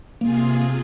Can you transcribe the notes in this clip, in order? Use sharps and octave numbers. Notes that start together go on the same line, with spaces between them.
C3 A#3 F4 G#4